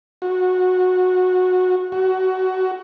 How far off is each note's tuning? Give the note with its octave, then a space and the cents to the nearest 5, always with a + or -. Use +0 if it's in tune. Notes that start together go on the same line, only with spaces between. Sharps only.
F#4 -15
F#4 +20